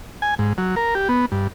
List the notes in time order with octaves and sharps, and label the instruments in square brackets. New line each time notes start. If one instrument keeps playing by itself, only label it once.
[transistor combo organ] G#5
G#2
F#3
A#4
G4
B3
G2